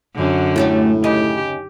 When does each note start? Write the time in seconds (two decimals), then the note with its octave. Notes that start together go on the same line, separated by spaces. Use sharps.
0.16 F#2 D3
0.56 A2 A3 C#4 G4
1.04 D#2 C#3 G4 D#5